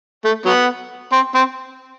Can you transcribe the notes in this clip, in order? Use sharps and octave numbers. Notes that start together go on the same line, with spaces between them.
A3
F#3 B3
C4
C4